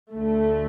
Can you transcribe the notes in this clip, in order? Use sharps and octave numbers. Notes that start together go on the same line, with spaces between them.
D2 D3 A3